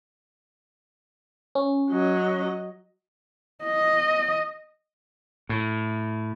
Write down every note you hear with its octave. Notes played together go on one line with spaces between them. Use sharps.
C#4
F#3 D#5
D#5
A2